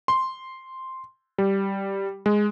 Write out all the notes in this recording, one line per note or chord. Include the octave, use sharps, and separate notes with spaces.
C6
G3
G#3